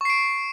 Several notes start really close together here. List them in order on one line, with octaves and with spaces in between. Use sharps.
C#6 C7 D7